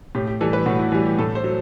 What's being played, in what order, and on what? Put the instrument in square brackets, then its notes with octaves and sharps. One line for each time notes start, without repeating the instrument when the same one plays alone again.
[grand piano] A2 G4
G4
E3 G3 A4
B4
A2 F#4
E4
E3 G3
G4
A2 A4
C5
F#3